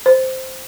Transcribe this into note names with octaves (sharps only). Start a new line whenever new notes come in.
C5